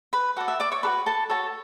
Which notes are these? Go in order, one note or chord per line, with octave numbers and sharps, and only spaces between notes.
B4 B5
F#4 A4 D5 F#5
E5
D5 D6
C#5 C#6
F#4 A4 B4 D5 B5
A4 A5
F#4 A4 C#5 A5